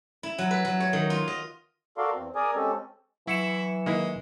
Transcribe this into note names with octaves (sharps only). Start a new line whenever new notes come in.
E4
F#3
B4
F#3
C#5
D#3
F4
D#5
F#4 A4 A#4 D5 F5 C6
E2 C4
G#4 A#4 D5 G#5 A#5 D#6
G#3 C4 C#4 G4 A4
E3 F#3 E4 C#7 E7
D#3 G#3 A#3 E4